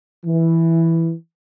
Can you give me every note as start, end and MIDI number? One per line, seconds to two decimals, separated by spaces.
0.25 1.12 52